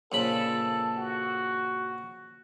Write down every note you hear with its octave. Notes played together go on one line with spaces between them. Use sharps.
A#1 C#3 A4 B5
F#4